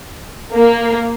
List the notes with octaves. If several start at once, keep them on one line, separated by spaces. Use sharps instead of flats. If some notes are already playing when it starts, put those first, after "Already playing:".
A#3